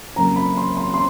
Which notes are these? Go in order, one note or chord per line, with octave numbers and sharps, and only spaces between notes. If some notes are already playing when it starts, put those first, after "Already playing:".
F2 C#3 F#3 A#3 A#5
B5
C6
C6
C6